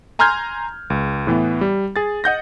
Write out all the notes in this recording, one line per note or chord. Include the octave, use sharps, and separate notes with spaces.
G#5 A#5 C6 F6 G6 G#6
C#2
A2 E3 B3
G3
G#4 A6
D#5 F#5 G6 A#6